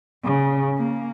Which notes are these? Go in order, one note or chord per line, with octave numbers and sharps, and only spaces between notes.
C#3
A#3